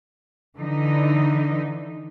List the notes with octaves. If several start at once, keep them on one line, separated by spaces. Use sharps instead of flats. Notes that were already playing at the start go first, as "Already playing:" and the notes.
D3 E3 D#4